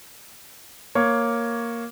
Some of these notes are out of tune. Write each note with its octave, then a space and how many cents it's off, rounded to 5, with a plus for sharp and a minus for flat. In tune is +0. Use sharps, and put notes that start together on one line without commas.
A#3 +0 C#5 +0